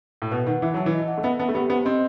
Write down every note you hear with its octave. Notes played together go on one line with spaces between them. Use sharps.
A2
B2 B4
D#3 F#5
E3 E5
F#3 A5
E3
D#5
F#5
A3
B3 E5
B3 A5
A3
B3 G4
B3 C5
C4 D#5